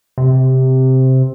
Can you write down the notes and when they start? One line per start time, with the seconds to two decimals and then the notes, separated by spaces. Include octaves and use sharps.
0.18 C3